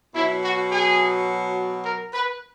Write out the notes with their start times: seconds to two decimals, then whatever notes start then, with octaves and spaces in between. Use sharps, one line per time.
0.14 B2 F#3 E4
0.42 F#4
0.70 G#4
1.84 A#4
2.13 B4